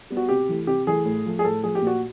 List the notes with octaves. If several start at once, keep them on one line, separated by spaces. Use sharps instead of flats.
G3 B3
F#4
C3 G4
E3 A3
C3 G4
E3 A3 G#4
A2
F3 A3
G#4
A2 A4
F3 A3 G#4
G4
A#2 F#4